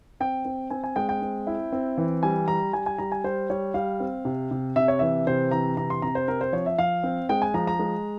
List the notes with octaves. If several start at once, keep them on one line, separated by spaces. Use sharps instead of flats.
C4 G5
C4
C4 G#5
G#5
G#3 G5
G5
C4
E4
C4
E3
G3 G#5
G3 A#5
G3 G#5
G#5
G3 A#5
G#5
G3 C5
G3 C#5
G3 F5
C4
C3
C3
C3 E5
C#5
E3 E5
C3 C5
E3 A#5
C3 A#5
C6
C3 A#5
C5
C4 A#4
C5
F3 C#5
E5
F3 F5
C4
G#3 G5
G#5
F3 A#5
A#5
G#3